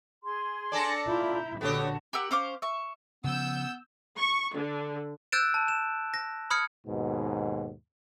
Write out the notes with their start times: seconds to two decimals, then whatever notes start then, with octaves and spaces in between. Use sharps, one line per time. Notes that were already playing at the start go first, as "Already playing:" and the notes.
0.23 G#4 C6
0.72 D4 A4 D5 G#5 A5 A#6 C#7
1.07 E4 F4 A#5 G6
1.61 A#1 D3 B3 F#4 G4 A4 C#5 A5
2.13 G4 A#4 F#5 E6
2.31 C#4 C5 F5 D6
2.62 E5 C#6
3.24 C#3 F3 B3 E6 G6
4.17 C#6
4.54 D3
5.32 E6 F#6 G6 A6 D7 E7
5.54 A5
5.68 E7
6.14 A#6
6.50 B5 D#6 F6 G#6 C#7
6.86 D#2 G#2 B2